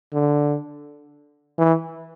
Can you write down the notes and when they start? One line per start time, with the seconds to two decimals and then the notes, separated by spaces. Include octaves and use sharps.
0.13 D3
1.58 E3